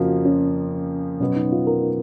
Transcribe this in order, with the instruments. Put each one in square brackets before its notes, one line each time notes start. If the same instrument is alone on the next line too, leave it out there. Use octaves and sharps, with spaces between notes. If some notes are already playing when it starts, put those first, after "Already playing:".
Already playing: [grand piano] F2 C#3 F3 A#3 [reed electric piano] F4 F#4
[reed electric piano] C#4
[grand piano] B2 F#3 B3 [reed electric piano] C#4
[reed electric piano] D#4
F4
A#4